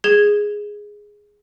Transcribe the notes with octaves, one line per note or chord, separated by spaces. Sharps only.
G#4 G#6 E7 G7